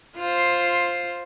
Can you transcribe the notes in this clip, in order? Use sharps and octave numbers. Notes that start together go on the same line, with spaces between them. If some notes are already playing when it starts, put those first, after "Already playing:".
F4 C5